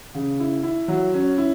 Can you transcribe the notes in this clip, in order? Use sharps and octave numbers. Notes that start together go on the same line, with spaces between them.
C#3
E4
E4
F#3
C#4
E4